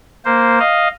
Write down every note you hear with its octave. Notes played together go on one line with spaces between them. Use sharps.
A#3 C5
D#5 F5